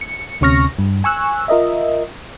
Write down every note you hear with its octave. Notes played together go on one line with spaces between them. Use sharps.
C#7
D2 C3 C#4 C#6 F6 A#6
G2
G#5 C#6 E6 F#6
F4 A#4 D#5 E5